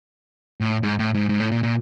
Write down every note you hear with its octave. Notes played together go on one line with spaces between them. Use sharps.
A2
G#2
A2
G#2
G#2
A2
A#2
A#2